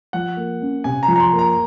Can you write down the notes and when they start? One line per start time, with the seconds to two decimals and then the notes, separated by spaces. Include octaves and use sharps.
0.13 F3 F#5
0.37 A#3
0.61 C#4
0.84 C3 G#5
1.03 A#5
1.08 F3
1.16 A#5
1.20 C6
1.33 A#3
1.39 A#5